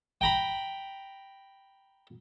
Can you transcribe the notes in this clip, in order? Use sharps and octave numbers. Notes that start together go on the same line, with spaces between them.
G5 A#5 B5